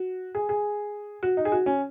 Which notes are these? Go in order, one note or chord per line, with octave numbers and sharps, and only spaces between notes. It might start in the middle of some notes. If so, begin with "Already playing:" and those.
Already playing: F#4
G#4
G#4
F#4
D#4
G#4
F#4
C#4